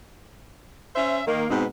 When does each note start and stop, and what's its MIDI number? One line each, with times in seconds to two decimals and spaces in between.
0.95 1.20 61
0.95 1.20 72
0.95 1.20 76
1.26 1.43 51
1.26 1.43 58
1.50 1.63 44
1.50 1.63 47
1.50 1.63 59
1.50 1.63 60
1.50 1.63 63